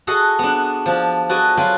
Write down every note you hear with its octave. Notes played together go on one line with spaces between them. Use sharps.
F#4 G#4 A4 D#5 F#5
B3 D4
F3 D4
F#4 A4 B4 D5 D#5 G#5
F#3 F4 B4 G5 G#5 B5